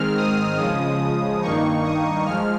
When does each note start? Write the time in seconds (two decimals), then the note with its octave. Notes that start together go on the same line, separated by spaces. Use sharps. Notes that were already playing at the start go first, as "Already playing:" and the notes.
Already playing: G#2 D#3 G#3 C4 F6
0.16 D#6
0.57 C#3 F3 G#3 D#6
1.41 G2 D#3 A#3 D#4 C#6
1.83 D#6
2.25 F3 G#3 F6